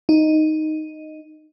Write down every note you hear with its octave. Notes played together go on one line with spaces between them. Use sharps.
D#4